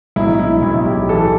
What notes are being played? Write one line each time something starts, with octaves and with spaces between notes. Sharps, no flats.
B1 E4
E4
B1 E4
G4
E3 A4